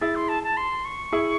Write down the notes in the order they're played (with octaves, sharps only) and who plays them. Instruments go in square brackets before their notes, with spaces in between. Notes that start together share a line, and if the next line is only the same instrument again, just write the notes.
[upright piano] E4 G#4 [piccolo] A6
[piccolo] C6
A5
A5
C6
C#6
[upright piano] E4 G#4